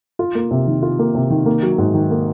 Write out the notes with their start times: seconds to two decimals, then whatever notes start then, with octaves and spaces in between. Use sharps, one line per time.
0.19 F4
0.35 A#3
0.51 C3
0.67 D#3
0.82 F4
0.99 A#3
1.15 C3
1.30 D#3
1.46 A#3
1.63 F#3
1.78 G#2
1.94 D#3
2.11 A#3